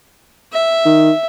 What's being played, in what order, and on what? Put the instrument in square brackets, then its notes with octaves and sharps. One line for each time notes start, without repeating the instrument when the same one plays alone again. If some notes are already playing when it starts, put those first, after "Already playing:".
[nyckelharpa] E5
[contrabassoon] D#3